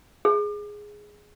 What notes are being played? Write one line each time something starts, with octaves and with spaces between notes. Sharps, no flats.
G#4